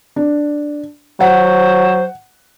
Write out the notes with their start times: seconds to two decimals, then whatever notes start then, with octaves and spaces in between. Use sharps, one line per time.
0.16 D4
1.21 F#3 C5 F#5